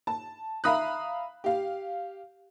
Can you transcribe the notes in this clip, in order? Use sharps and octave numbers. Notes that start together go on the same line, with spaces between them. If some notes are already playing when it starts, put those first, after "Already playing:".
A5
E5 F5 A#5 B5 D#6 F#6
G4 F5